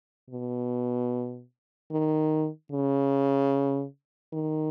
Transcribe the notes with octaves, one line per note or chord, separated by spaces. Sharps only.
B2
D#3
C#3
D#3